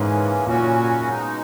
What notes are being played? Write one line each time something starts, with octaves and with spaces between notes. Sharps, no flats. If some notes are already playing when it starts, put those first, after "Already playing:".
Already playing: G#2 C#3 E3 A#3 C#4
F#2 A#2 C#3 F#3 C#4 F#4
B2 G#3 D#4